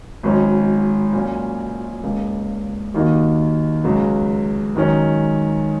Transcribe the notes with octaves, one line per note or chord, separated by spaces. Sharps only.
G#1 G#2 F#3 C#4
A#2 F#3 C#4
C#2 C#3 A#3
D#2 D#3 A#3 D#4 F#4
C#2 C#3 F#3
G#2 D#3 F#3 C#4